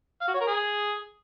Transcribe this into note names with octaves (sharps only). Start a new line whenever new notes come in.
F5
F#4
C#5
A#4
G#4